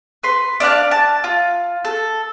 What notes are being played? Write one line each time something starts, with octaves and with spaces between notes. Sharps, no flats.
B4 C6
D4 D5 F5 F#6
A5
F4
A4